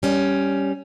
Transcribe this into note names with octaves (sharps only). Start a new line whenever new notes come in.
G3 C#4